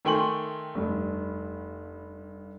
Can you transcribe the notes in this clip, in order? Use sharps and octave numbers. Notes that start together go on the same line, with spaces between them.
D#3 A3 G5 G#5 C6 F#7
F1 G2